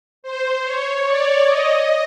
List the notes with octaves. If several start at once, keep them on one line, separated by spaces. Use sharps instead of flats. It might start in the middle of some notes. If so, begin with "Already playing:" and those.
C5
C#5
D5
D#5